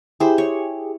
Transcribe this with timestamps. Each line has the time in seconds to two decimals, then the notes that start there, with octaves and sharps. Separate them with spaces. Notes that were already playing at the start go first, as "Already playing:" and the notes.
0.20 E4 G4 G#4 C5
0.38 C#5